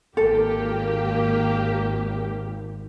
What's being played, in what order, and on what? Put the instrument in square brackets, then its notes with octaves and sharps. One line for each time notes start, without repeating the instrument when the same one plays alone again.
[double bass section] G#1 [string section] A#3 G4 [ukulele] A4